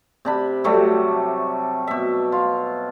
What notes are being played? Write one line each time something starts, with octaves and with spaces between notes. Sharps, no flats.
C3 D4 B5
C3 F#3 G3 A3
B2 E5
F4